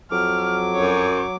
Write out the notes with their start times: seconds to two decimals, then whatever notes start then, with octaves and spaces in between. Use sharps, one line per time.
0.11 F2 F#3 D6 F6
0.75 F#2 C#5